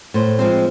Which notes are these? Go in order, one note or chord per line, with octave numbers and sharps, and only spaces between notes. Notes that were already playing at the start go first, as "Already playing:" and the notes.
A2 C5
F3 G#3 C4 C5